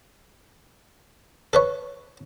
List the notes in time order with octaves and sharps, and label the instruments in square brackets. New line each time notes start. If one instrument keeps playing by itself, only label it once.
[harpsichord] A4 B4 C#5